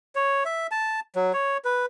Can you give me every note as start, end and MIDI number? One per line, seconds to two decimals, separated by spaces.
0.15 0.44 73
0.45 0.67 76
0.71 1.00 81
1.16 1.32 54
1.33 1.57 73
1.65 1.86 71